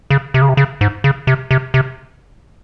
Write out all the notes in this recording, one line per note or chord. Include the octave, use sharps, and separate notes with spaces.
C#3
C3
C#3
C3
C#3
G#2
C#3
C3
C3
C3